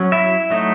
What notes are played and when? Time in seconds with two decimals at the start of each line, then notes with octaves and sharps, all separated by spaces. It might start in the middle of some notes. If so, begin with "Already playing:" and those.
Already playing: F#3 C#4
0.12 E4 E5
0.50 F#3 A3 D#4